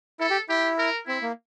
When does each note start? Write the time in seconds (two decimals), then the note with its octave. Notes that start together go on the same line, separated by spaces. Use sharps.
0.20 E4 A4
0.30 G4
0.49 E4 G4
0.78 A#4
1.07 C4 E4
1.22 A#3